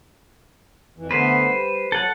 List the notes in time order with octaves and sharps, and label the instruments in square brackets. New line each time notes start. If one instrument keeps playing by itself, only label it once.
[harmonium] F2 E3
[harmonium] D3 A3 B3 [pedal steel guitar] B4 C5
[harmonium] G3
[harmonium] F#3 [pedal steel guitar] A4 F#5